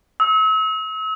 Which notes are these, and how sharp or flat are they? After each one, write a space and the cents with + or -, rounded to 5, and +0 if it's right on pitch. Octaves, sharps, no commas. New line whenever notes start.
E6 -40